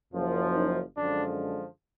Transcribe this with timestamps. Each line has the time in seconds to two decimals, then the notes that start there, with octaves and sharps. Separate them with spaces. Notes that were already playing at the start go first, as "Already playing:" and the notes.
0.13 F#1 F#2 F3
0.55 D#4
0.97 F#2 D3 F3 G#3 D4